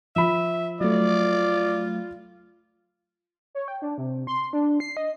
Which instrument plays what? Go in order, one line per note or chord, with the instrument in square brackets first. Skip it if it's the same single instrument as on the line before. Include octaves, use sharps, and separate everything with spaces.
[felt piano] F3 B5 [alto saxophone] E5
[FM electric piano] F#3 A3 [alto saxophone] F4 [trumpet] D5
[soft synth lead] C#5
G5
D4
C3
C6
D4
C7
D#5